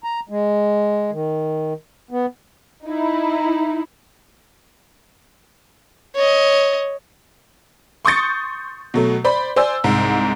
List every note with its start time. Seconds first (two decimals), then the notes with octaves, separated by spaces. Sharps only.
0.04 A#5
0.29 G#3
1.12 D#3
2.11 B3
2.86 D#4 E4
6.16 C#5 D#5
8.05 C6 C#6 D#6 G6 A6 C#7
8.94 B2 F#3 A3
9.24 C5 D5 B5
9.56 C5 D5 G#5 E6
9.84 C2 G#2